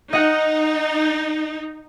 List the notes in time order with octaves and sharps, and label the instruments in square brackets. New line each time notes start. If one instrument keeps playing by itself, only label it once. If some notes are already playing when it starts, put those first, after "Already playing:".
[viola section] D#4 [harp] D#5 F#5